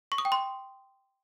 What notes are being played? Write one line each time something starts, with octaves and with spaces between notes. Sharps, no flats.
C#6
D#6
G5
C6